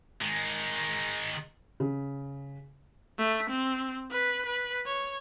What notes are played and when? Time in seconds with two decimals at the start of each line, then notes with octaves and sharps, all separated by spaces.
0.22 D#3 G#3
1.80 C#3
3.18 A3
3.50 C4
4.11 B4
4.46 B4
4.86 C#5